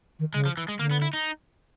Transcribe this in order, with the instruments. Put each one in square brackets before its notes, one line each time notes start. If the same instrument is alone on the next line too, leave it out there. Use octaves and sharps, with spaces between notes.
[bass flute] D#3
[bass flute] C#3 [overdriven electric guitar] G#3
[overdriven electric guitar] F3
E3
G#3
[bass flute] D3 [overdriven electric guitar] A#3
[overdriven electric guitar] B3
E4
D#4